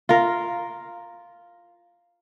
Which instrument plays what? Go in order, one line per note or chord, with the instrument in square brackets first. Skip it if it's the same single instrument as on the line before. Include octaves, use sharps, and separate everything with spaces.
[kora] F4 A#4